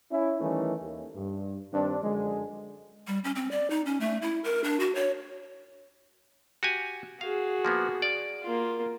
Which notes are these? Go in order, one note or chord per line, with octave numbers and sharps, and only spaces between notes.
C#4 E4
D#3 E3 G3 A3 C#4 D#4
D#2
G2
G2 D#3 C4 D4
F#2 D3 F3 G#3
G3
C#4
C4
D5
D#4
C#4
A3
E4
A#4
D4
F#4
C#5
F#4 G4 G#5
F#4 G#4 F5
F3 A#3 B3
D5
A#3 F4